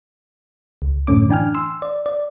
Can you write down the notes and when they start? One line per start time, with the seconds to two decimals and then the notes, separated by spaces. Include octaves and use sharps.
0.82 C#2
1.07 F#2 A2 D3 A3 C#4 D6
1.29 E3 D4 G5 G#5 F6
1.54 C6 E6
1.82 D5
2.06 D5